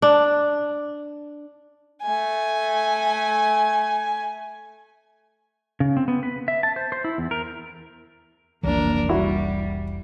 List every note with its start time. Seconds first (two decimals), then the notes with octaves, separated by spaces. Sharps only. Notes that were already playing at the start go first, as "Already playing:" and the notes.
0.02 D4
2.02 A3 G#5
5.80 C#3
5.97 C4
6.08 B3
6.23 B4
6.48 E5
6.63 A5
6.76 C5
6.92 C5
7.04 E4
7.18 E2
7.31 A#4
8.63 F1 C2 E3 A#3 D4 A#4
9.09 G3 E4 F#4